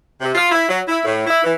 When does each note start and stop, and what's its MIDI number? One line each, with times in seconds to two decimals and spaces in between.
0.21 0.32 48
0.35 0.49 65
0.52 0.67 64
0.69 0.81 54
0.88 1.00 64
1.05 1.24 45
1.27 1.42 64
1.44 1.54 52